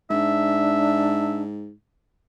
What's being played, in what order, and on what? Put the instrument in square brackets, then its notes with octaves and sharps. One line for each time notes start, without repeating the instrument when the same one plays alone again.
[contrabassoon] G#2 [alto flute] D4 [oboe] E5